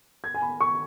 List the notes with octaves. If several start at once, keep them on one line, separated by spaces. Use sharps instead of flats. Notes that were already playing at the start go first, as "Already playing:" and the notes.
G#6
G#5
B5
C#6